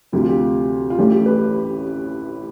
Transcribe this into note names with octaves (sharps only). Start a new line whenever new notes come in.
D2 C3 F3 G4
F4
G4
F4
A1 A2 E3 A3 G4
G4
B4